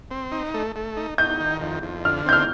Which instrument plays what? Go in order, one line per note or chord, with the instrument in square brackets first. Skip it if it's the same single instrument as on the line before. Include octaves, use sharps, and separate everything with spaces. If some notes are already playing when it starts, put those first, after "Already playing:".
[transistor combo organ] C4
D#4
A3
A3
D#4
[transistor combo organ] D#4 [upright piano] G6
[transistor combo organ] D#3
F2
F2
[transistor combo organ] D3 [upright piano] F6
[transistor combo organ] C4 [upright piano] G6
[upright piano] F6